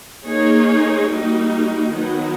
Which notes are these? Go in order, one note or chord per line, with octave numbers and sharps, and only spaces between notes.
A#3 D#4 G#4 C#5
G3 A#3 D#4 F#4
D#3 F#3 B3 D#4